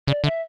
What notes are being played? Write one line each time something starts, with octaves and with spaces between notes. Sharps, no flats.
C#3 D5
D3 E5